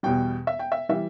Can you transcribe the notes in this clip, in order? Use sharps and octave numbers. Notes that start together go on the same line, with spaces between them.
E2 B2 G3 G5
E5
G5
E5
E3 G3 E5